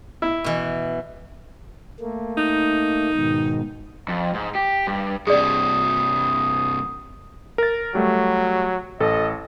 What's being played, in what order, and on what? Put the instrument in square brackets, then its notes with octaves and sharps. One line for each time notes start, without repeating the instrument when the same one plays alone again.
[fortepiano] E4
[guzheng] B2 E3
[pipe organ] A3 A#3
[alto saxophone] D#4
[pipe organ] G#2 B2 D#3
[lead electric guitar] F2
G#2
G4
G2
[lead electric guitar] G2 C3 [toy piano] G#4 D5 [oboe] D#6
[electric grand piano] A#4 A6
[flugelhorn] F#3 [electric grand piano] G3 A3
[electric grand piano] A1 A4 [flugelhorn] D#5